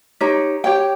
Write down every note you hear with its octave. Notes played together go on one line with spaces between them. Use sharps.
D#4 G4 C#5
G4 C#5 G5